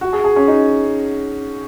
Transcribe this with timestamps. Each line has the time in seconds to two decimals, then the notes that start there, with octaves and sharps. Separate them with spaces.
0.01 F#4
0.13 G#4
0.24 G#4
0.36 C#4
0.48 D#4